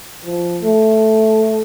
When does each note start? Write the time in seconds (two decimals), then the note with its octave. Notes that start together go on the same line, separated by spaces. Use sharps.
0.25 F3
0.61 A3